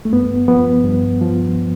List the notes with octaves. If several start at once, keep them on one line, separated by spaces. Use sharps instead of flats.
A3
G2 B3
F3 B3
G2
F3